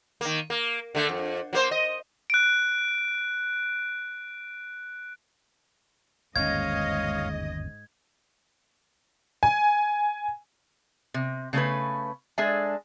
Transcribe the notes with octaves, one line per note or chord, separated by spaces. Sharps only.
D#3 A#3
A#3
D3 A3
F2
F#3 A#3 C5
D#5
F#6 D7
G1 D#2 G#2 C#4 C#5 D#5 F5 G#6
G#5
C3
C#3 A3 C#4 B4
G#3 D4 G#4 A4 E5 G#5